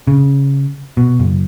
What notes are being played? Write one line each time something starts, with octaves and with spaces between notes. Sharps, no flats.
C#3
B2
F#1